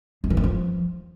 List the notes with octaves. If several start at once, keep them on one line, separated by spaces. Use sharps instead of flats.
F#2
E3
F#2
F3